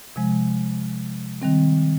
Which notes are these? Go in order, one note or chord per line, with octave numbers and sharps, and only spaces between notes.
C3 F3 G#3
D#3 G3 C4